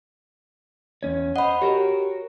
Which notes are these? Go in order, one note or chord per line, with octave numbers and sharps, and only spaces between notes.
E2 C#4 C#5
C5 D#5 F#5 B5
F#4 G4 A#4 C#5